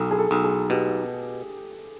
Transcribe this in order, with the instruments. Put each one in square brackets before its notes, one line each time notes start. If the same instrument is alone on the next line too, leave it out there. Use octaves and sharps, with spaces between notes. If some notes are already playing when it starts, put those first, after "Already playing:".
Already playing: [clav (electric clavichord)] B1 [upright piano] A4
[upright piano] G#4
A4
[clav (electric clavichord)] B1
[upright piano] G#4
[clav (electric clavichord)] B2 [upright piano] G4